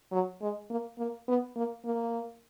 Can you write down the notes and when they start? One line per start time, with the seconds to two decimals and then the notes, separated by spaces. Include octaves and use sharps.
0.12 F#3
0.42 G#3
0.70 A#3
0.98 A#3
1.28 B3
1.56 A#3
1.85 A#3